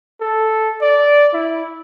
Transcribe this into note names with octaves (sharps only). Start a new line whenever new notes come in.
A4
D5
E4